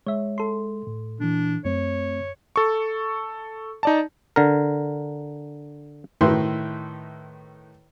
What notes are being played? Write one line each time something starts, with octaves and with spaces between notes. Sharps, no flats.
G#3 C#5 E5
A4 C6
A2
A#2 E3 D4
F#2 A3 C4 C#5
A4 C#6
D#4 D5 A5
D3 A#4
A2 D#3 E4 B4 E5 C6